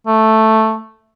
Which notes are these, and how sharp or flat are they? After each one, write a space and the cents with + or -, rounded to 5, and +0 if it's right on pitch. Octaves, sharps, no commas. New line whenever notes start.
A3 +0